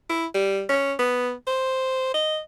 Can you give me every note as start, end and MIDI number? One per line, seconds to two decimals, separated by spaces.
0.09 0.26 64
0.34 0.63 55
0.69 0.93 61
0.99 1.33 59
1.47 2.12 72
2.14 2.39 75